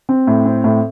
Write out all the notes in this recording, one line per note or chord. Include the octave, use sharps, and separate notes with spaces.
C4
A2
C4
A2